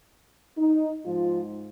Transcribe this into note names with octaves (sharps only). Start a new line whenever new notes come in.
D#4
G#2 F3 G#3 F4